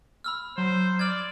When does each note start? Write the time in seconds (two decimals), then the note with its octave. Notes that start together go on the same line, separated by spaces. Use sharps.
0.24 B5 E6 F6
0.58 F#3 C5 A#5
0.99 D5 F6 G#6